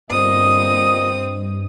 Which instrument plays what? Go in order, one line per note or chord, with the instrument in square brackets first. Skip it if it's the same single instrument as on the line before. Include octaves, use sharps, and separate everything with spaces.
[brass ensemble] G1 A#2 D#5 [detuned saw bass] G2 [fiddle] C4 [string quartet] D#6